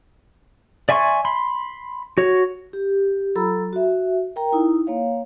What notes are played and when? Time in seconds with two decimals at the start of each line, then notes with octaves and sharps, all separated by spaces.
0.89 D5 E5 G#5 C6 C#6
1.25 B5 C6
2.18 F#4 C#5
2.73 G4
3.35 F#3 F4 A4 A#5 B5 E6
3.73 F#4 E5
4.36 A#4 G5 A#5
4.52 D#4 E4
4.87 A#3 C#5 F5